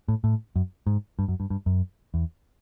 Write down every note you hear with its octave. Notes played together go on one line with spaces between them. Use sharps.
A2
A2
F#2
G#2
G2
F#2
G2
G2
F#2
E2